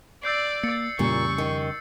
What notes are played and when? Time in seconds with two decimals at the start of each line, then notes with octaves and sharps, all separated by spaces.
0.23 D5 E6 G6 C7
0.63 A#3 A6 C#7
0.99 F2 A#2 C#3 G3 C#6
1.38 D#3